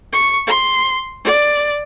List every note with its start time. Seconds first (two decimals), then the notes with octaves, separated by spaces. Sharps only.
0.13 C#6
0.47 C6
1.25 D5